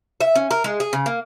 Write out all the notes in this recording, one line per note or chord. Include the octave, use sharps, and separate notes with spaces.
E5
C#4
A#4
G#3
G#4
C#3
A#3